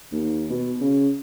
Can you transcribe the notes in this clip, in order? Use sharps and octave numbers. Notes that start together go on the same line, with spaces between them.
D#2
B2
C#3